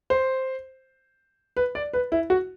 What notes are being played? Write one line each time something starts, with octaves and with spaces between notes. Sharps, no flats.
C5
B4
D5
B4
E4
F#4